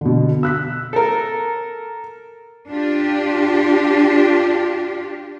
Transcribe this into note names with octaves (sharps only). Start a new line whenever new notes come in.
B2 D3
E6 F#6 B6
A4 A#4
D4 F4 G4